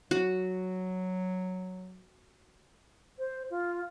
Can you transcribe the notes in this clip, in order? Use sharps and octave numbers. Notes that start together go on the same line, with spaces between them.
F#3 F#4
C5
F4